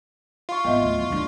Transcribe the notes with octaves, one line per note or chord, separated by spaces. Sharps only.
F4 F5 C6 C#6
G#1 B3 D#5 E5
D2
E2
D3 D4